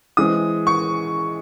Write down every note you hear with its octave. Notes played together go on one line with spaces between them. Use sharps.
E3 G#3 C4 D#6
C#6